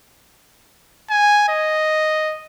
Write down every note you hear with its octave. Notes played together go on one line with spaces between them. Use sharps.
G#5
D#5